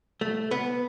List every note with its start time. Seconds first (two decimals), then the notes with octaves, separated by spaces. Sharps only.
0.21 A3
0.51 B3